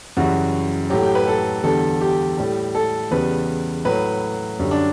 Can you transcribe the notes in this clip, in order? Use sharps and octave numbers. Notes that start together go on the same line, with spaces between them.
F#2 C#3 E3 G3 F#4
A2 F#3 G4
G4
B4
A4
E2 D3 G3 A4
G4
A2 G3
A4
E2 C#3 G3 B4
A2 F#3 B4
F#2 D3 G3
D4